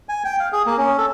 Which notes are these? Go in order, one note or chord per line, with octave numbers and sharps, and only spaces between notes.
G#5
G5
F5
G#4
A#3
C#4
A4